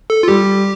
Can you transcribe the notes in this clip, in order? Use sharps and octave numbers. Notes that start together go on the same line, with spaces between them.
A4
F4
G3 G4